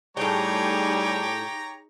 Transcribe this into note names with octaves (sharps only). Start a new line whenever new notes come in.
A2 G3 D#4 G4 G#4 C#5 G5 A#5